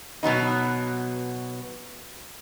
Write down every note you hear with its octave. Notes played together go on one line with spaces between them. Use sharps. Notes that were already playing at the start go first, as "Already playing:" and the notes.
B2 F#3 B3 D#4